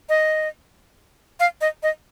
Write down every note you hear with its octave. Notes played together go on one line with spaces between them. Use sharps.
D#5
F5
D#5
D#5